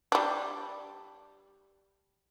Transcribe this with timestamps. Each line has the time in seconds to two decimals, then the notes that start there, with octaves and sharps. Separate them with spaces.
0.12 G3 D4